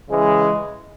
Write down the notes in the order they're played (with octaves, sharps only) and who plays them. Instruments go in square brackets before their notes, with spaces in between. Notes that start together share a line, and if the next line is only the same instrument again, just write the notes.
[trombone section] C#3 E3 G#3